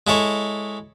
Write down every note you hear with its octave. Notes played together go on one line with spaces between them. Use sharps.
G#3 E4 A4 C#5